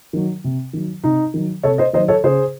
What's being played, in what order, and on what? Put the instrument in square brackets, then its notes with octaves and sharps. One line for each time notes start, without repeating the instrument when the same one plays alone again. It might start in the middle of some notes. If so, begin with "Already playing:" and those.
[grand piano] D#3 F#3
C3
D#3 F#3
C3 D#4
D#3 F#3
C3 A4 C#5
C5 D#5
D#3 C5 D#5
F#3
A4 C#5
C#3 G#4 C5